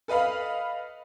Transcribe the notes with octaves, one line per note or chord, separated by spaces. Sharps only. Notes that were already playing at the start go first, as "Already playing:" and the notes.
A4 B4 D#5 F5 B5